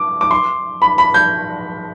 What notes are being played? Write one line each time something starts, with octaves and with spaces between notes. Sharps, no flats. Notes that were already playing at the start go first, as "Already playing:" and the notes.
Already playing: D6
D6
C6
B5
B5
G6